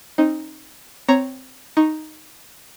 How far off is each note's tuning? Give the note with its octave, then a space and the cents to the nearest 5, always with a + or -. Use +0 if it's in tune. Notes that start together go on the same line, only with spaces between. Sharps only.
C4 +35 D#4 +0
C4 -10 C#5 +0 A#5 +0
D#4 +0 A#5 +0 C#6 -10